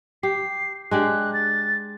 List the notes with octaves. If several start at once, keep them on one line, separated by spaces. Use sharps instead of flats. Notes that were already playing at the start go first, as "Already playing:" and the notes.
G4 C7
G#3 D4 G4 F#6
A6